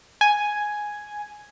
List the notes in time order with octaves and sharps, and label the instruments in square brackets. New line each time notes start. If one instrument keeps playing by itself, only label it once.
[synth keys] G#5